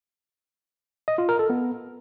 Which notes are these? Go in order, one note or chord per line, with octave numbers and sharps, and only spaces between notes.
D#5
F4
A#4
A4
B3